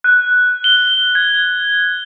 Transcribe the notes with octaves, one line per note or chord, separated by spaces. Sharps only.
F#6
G7
G#6